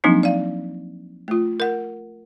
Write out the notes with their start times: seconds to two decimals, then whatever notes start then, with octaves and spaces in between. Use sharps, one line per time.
0.04 F3 F#3 A#3 C4 D4 D#4
0.23 D5 F5
1.28 A3 F4
1.60 A#4 F#5